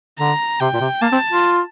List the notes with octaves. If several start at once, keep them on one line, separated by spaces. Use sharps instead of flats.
D3 A#5
C3 G5
A#2
C3
A#3 A5
C4
F4